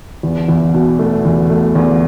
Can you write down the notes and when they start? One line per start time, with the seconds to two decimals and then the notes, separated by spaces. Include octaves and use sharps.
0.23 E2
0.48 E2
0.74 B2
0.99 A3
1.25 E2
1.50 A3
1.75 E2